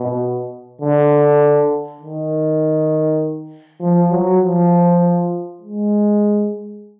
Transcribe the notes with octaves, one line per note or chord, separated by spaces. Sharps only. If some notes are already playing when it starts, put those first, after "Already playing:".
Already playing: B2
D3
D#3
F3
F#3
F3
G#3